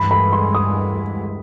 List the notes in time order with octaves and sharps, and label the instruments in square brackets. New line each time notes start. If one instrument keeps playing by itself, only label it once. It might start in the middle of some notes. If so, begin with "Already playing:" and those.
Already playing: [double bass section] G2 E3 G#3 [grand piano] B5
[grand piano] B5
C6
D#6